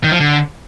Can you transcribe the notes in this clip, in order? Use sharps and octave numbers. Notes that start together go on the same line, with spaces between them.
D#3
F3
D3